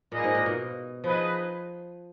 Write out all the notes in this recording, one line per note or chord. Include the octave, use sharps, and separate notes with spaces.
A#2 A#3 D#4 G#4 B4 D#5
G#2
A#2
B2
F3 D#4 G#4 B4 D#5